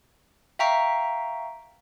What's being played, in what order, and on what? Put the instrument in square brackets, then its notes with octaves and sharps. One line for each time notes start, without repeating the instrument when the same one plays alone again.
[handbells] E5 F5 G5 A#5 C#6 B6